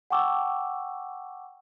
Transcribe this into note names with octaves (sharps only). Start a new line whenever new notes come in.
F#5 G5 A5 C#6 D6 E6